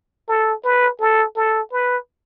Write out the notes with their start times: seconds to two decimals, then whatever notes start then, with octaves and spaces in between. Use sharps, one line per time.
0.28 A4
0.64 B4
1.00 A4
1.36 A4
1.72 B4